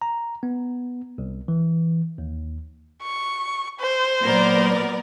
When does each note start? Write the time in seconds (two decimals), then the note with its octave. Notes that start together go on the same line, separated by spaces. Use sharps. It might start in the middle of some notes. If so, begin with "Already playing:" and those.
0.02 A#5
0.43 B3
1.18 C2
1.48 E3
2.18 D#2
3.03 C#6
3.80 C5
4.22 A#2 F#3 B3 A#4 D5